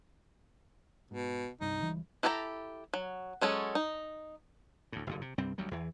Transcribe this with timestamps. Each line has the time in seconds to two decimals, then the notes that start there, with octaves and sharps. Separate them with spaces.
1.11 G#2 B2
1.61 G1 C2 G2 D#4
1.81 C#2 E3 G3
2.23 E4 G4 A4 G#5 A#5
2.94 F#3
3.41 F#3 G#3 C#4 A4
3.75 D#4
4.92 D2 A2
5.07 F#1 G2 D3
5.21 C3
5.38 C2 G2 G3 C4
5.58 D2 F#3 G3
5.71 E2 E3